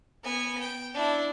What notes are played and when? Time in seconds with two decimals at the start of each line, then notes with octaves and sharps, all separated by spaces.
0.24 B3 G#5
0.60 G5
0.94 D4 E4